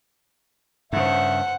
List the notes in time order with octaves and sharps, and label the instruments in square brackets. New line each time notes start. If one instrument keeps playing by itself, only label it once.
[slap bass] G2 C#3 [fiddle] C5 F#5 [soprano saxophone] E5